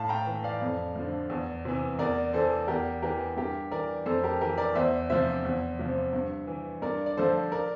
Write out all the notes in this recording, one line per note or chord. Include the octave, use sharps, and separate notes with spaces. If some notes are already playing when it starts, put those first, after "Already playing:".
Already playing: A2 F5 A5
G5 A#5
E3
D5 F5
F2
D3 F3
E2
C3 E3
E2 A#4 D5
E3 A4 C5
E2 G4 A#4
E3 G4 A#4
G2 G4 A#4
E3 A#4 D5
F2 A4 C5
G4 A#4
E3 G4 A#4
A#4 D5
E2 C5 E5
C3 F3 C5 E5
E2
C3 F3
G2
E3
G2 A#4 D5
D5
D3 F3 A4 C5
A#4 D5